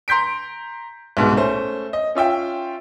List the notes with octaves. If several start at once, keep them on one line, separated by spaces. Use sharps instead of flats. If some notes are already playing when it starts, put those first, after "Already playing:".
A#5 C6 G6 B6 D7
C2 G#2 B2 G#3
A3 C#4 C5
D#5
C#4 F4 E5 G5